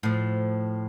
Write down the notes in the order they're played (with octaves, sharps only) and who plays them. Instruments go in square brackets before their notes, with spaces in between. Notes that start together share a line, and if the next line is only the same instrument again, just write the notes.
[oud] A2 F3